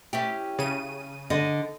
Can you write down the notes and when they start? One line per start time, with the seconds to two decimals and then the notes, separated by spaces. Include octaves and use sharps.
0.13 C#4 E4 G4
0.59 C#3 D#7
1.30 D3 D#5